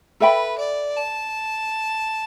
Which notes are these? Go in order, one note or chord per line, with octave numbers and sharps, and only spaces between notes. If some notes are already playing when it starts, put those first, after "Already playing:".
A4 B4 E5 G5 B5
D5
A5